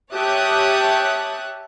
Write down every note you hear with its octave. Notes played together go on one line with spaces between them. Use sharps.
G4 C#5 E5 A5 D#6 F#6